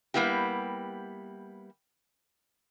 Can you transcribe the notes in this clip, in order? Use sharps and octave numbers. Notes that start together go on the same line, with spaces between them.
G3 A#3 B3 E4 G4